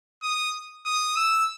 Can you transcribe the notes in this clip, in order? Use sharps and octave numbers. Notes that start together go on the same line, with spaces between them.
D#6
D#6
E6